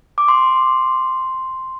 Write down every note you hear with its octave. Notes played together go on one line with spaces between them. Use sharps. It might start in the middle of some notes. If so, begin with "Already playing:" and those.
D6
C6